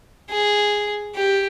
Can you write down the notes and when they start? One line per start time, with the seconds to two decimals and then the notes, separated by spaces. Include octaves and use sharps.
0.30 G#4
1.15 G4